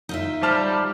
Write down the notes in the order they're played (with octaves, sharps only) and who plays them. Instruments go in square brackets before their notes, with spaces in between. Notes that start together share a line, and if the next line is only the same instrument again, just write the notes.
[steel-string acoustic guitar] D#4 F4 E5
[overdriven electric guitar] G3 [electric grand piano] C5 A5 F6